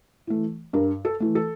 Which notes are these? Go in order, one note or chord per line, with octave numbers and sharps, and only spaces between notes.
E3 A3
G2 A#4
A4
E3 A3
A4